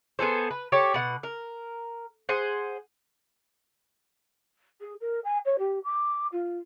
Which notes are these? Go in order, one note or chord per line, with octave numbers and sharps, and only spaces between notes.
B3 G#4 A4 C5
B4
G4 A4 C#5
B2 F#5
A#4
G#4 C5 F#5
G#4
A#4
G#5
C#5
G4
D6
F4